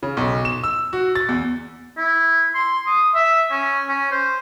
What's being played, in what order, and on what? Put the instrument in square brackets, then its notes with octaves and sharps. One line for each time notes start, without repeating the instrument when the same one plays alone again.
[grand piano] C#3
B1
E7
E6
F#4
A6
E2
[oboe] E4
C6
D#6
E5
C#4
C#4
C5